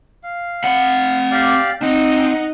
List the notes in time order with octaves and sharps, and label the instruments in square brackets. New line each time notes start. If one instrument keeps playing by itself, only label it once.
[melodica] F5
[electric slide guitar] C4 F#5
[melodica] G4 D5 F5
[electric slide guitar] C4 [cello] D#4 [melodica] F#5